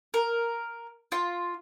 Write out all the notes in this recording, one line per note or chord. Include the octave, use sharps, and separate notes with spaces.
A#4
F4